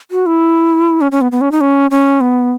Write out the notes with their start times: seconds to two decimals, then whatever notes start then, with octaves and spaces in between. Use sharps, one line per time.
0.11 F#4
0.26 E4
1.01 C#4
1.12 C#4
1.21 B3
1.32 B3
1.41 C#4
1.52 D#4
1.61 C#4
1.91 C#4
2.21 B3